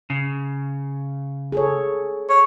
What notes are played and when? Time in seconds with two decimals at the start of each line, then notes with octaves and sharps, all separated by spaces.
0.10 C#3
1.52 G#4 A4 C#5
2.29 C#5